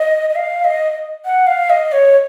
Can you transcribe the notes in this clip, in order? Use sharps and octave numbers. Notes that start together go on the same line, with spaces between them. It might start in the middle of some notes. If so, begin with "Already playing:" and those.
Already playing: D#5
D#5
F5
D#5
F#5
F5
D#5
C#5